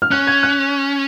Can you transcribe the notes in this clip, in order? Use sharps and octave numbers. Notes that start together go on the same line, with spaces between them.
F6
C#4 F#6
G#6
F#6